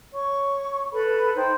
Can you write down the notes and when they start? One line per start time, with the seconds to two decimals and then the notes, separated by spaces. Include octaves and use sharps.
0.13 C#5 C#6
0.92 A4 B4 B5
1.35 D#4 C5 G5